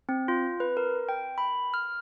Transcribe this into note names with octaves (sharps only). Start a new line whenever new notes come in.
C4
F4
B4
A#4
G5
B5
F6